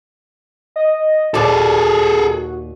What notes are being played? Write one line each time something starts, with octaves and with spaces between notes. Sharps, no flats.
D#5
D#2 A#2 F#4 G#4 A4 D5